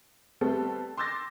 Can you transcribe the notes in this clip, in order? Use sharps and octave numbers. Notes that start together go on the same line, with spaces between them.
G3 A3 B3 C4 A4
C6 D6 E6 G6 A6 A#6